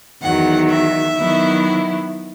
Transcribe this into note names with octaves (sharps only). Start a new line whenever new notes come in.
E2 D#3 F#3 F#5
E5
D#3 F#3 B3 E4